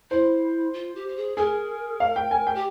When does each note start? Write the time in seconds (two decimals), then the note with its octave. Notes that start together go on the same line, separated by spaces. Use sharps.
0.11 E4 C5
0.73 F4
0.95 G4
1.08 G4
1.16 G#4
1.37 G#4 A#4
2.00 F5
2.16 G5
2.31 G#5
2.47 G5
2.55 G4